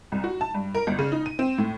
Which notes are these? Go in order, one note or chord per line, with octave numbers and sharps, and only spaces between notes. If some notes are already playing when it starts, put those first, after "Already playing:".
C2
F#4
A5
G2
A#4
G1
C#3
D#4
D#7
C4
A2